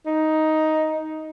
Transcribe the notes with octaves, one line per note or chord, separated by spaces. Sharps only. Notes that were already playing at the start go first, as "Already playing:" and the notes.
D#4